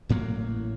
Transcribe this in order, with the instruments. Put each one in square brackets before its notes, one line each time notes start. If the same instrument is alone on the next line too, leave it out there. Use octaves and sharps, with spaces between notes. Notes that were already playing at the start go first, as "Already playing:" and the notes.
[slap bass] A1 A2 F#3 A#3